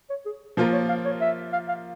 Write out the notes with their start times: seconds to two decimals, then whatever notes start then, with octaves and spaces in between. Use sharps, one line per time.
0.10 C#5
0.25 G#4
0.57 F3 A#3 F4 A#4 C5
0.73 C#5
0.88 F5
1.05 C#5
1.21 E5
1.53 F5
1.68 F5